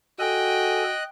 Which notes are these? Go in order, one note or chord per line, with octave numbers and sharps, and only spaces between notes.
F#4 A4 D#5 G5 G#5 F#6